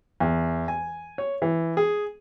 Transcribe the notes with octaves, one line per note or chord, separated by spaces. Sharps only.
E2
G#5
C#5
E3
G#4